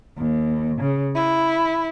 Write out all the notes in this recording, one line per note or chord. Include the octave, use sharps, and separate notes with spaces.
D#2
C#3
E4